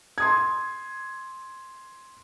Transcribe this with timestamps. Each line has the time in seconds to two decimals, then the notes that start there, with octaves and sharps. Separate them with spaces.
0.18 C6 D#6 G#6